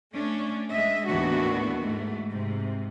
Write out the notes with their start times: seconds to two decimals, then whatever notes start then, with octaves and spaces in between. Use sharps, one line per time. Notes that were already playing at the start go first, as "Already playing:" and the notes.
0.13 A3 C#4 D4
0.71 G#3 D#5 E5
1.08 D#2 A2 E3 B3 D4 F#4
1.79 G#2 A3
2.30 G#2 C3